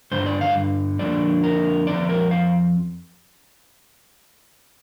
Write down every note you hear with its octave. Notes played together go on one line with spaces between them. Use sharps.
G2 D3 G3 C5
D5
F5
F2 D3 A#3 D4 D5
A#4
F2 F3 C4 D5
A#4
F5